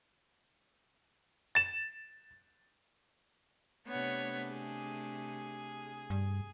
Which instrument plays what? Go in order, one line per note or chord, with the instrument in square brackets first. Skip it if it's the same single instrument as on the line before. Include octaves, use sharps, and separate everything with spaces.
[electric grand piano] A6 E7
[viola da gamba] C3 A3 D4 [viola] B3 C#5
[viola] G#4
[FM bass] G2